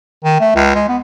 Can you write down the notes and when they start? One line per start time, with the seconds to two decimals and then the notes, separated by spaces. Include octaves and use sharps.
0.24 D#3
0.41 A3
0.56 C#2
0.75 G#3
0.89 B3